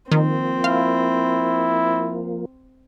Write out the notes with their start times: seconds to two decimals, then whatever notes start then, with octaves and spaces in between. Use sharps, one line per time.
0.12 D#3 F3 A#3 C4
0.64 E4 F5